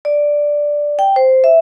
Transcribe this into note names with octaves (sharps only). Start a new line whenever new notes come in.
D5
G5
C5
E5